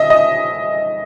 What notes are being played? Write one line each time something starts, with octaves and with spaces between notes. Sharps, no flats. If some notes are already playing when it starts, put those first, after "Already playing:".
Already playing: D#5 E5
D#5